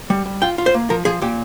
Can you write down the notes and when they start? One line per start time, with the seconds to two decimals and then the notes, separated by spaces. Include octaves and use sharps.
0.10 G3
0.26 G3
0.42 F4 G5
0.58 F4
0.66 C5
0.74 A#3
0.90 F3 A#4
1.05 F3 G#4
1.22 A#2 G4